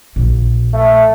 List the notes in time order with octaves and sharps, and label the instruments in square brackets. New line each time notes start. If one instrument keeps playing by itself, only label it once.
[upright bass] A#1
[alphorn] A3